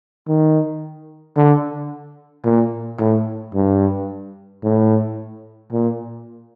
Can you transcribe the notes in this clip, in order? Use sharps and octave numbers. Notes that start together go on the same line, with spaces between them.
D#3
D3
A#2
A2
G2
A2
A#2